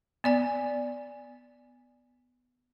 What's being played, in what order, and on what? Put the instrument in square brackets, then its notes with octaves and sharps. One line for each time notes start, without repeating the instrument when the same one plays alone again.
[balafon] B3 D5 G#5